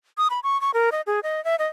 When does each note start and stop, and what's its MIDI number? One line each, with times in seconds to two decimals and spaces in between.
0.18 0.28 87
0.30 0.40 83
0.44 0.60 85
0.61 0.71 85
0.74 0.90 70
0.92 1.01 75
1.07 1.20 68
1.23 1.43 75
1.45 1.56 76
1.59 1.67 75